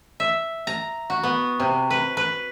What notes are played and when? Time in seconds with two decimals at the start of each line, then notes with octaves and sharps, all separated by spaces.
0.20 E5
0.67 A#5
1.10 F#4
1.23 B3
1.60 C3
1.91 B4
2.17 B4